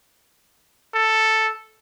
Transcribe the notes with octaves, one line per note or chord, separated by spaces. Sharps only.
A4